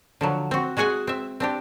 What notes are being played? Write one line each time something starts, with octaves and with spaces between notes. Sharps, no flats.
D3 F3 F#3
C4 F#4
G#3 F#4 G#4 F#5 G#5
C4 E5
C4 D4 G4